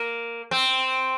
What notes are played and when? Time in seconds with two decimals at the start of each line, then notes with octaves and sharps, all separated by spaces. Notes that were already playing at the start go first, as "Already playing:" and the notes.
Already playing: A#3
0.51 C4